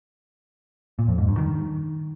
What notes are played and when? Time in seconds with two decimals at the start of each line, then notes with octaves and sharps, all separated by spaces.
0.99 A#2
1.08 F2
1.18 G#2
1.28 G2
1.37 D#3